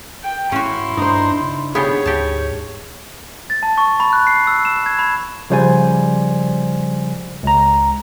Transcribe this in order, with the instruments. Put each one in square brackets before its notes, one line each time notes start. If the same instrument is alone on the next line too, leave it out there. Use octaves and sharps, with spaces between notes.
[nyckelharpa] G5
[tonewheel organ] G#2 [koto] C#4 F#4 [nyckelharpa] E4 C6
[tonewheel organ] G2 D4 A#5 [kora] D#4 C5
[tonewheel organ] C#3 D4
[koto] B3 G4 [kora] G#4 [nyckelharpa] C#5
[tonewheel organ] D2 G#2 [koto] G4 A5
[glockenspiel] A6
A5
C#6
B5
F#6
C7
E6
E7
G#6
B5
[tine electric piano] C#3 F3 G3 C5 D5 G#5
C#2 A#5